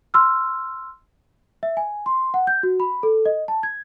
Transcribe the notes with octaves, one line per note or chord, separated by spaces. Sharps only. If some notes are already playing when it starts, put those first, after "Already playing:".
C6 E6 F6
E5
G#5
C6
F#5
G6
F#4
B5
A4
D#5
A5
G#6